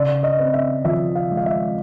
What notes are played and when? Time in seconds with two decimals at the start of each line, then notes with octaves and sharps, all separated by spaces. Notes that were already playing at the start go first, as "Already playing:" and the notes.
Already playing: C#3 D5
0.23 D#5
0.39 C4
0.54 E5
0.85 F3 E5
1.15 F5
1.31 G#3
1.37 F5
1.46 E5